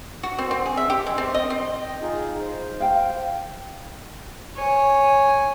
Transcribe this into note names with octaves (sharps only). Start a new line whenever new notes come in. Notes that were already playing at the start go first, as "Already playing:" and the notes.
F#4
C4
C4
G#4
E5
G4
G#3
C4
D#5
C4
D#5 G5
D#4 F4 G#4
C5
F5 G5
C#5 G#5